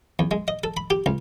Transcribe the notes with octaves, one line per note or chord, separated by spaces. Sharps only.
E2
G#3
D#5
A4
B5
G4
C#2